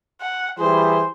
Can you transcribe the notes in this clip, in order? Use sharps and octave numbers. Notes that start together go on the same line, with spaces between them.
F#5
E3 G3 G#4 C5